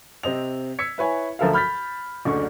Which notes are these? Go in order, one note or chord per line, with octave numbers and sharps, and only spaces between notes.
C3 C4 D#5 F7
E6 G#6 B6 C#7
E4 B4 C#5 G#5
D2 F3 A4 A#4 E5 F5
B5 F6 G6 A6 B6
F#1 D2 D3 C#6